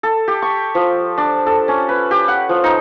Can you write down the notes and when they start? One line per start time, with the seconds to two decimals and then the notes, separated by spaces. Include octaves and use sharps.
0.03 A4
0.28 G4
0.42 C#6
0.75 F3
1.18 D4
1.46 A4
1.68 C#4
1.89 B4
2.11 G4
2.28 F#5
2.49 F3
2.64 D#4